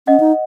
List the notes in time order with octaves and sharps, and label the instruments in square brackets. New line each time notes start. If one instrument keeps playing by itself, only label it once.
[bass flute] C#4 [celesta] D#5 F#5
[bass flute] D#4